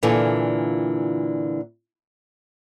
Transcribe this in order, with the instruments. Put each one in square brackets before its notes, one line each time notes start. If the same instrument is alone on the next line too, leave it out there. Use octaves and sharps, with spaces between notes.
[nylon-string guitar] A#2 D3 E3 F4 A4 G#5